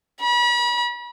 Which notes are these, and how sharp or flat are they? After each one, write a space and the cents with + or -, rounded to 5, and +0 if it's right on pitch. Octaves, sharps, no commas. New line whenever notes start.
B5 -40